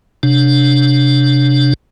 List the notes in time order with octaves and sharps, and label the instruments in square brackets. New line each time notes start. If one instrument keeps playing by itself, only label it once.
[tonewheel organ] C3 D4